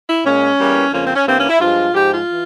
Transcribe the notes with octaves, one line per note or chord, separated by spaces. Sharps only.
E4
A#2 G#3 C#4
E2 E3 G3 A#3
F2 C#3 F3 A#3 C#4
C4
C#4
G2 E3 G3 A#3 C4
C#4
E4
G2 F3 G#3 F4
G#2 F3 G#3 G4
F4
E3